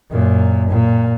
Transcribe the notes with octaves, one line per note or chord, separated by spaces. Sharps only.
F#2 A#2
A#2